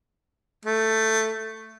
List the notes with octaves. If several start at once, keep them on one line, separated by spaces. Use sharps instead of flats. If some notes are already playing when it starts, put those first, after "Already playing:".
A3